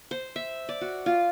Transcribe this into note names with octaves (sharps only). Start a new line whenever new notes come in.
C5
E5
D5
F#4
F4